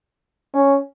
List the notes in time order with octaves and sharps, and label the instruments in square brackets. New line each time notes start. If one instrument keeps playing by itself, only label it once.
[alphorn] C#4